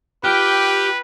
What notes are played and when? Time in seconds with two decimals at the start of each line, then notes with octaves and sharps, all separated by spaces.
0.24 F4 G4 B4 G5 F6 F#6